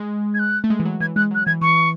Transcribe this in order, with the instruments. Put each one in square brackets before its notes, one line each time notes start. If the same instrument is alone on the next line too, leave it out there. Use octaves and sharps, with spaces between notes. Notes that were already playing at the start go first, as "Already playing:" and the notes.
Already playing: [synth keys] G#3
[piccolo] G#6
F#6
[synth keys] A3
G#3
E3
F#3
[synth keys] E3 [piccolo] G#6
[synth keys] G#3 [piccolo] F#6
[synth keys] F#3 [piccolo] F#6
[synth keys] E3 [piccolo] G#6
[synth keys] E3 [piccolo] C#6